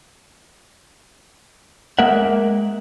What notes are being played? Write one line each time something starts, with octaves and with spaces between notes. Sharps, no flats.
G#3 A#3 A#4 E5 F#5